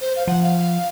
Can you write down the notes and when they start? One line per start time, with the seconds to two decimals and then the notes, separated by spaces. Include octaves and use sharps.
0.01 C5
0.16 F5
0.27 F3 F#5
0.43 F5